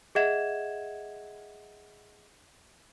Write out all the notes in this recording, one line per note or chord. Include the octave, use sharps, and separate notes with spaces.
G#4 D#5 E5 F#5 G#6 E7